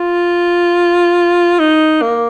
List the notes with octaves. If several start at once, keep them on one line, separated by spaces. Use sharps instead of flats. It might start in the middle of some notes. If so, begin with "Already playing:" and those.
Already playing: F4
D#4
A#3